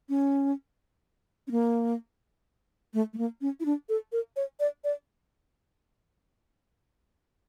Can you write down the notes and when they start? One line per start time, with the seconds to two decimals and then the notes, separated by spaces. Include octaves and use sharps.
0.09 C#4
1.47 C#4
1.51 A#3
2.94 A3
3.13 A3
3.18 A#3
3.41 C#4
3.60 E4
3.66 D4
3.89 A4
4.12 A#4
4.36 C#5
4.60 D5
4.84 D5